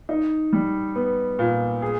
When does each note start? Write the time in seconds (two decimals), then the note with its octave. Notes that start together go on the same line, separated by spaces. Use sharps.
0.09 D#4
0.53 G3
0.95 B3
1.39 A#2
1.82 G#4